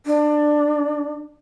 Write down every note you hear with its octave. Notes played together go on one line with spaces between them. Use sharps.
D4